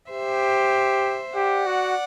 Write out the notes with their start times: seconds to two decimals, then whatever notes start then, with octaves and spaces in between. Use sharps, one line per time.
0.10 G4 C5 E5
1.36 G4 D5 F#5
1.67 F#4